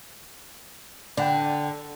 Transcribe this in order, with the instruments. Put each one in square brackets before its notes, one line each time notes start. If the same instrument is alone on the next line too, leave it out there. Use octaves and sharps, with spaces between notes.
[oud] D3 [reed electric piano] D5 F#5 G5